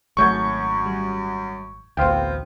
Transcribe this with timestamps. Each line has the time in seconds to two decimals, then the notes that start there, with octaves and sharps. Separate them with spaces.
0.17 G#1 F#2 F#3 A3 C#6 G6 G#6
0.86 G3
1.97 A1 D2 B3 C4 C5 F5 G5